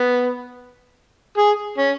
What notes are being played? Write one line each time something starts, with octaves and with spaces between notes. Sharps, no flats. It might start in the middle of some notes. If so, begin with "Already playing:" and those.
Already playing: B3
G#4
C#4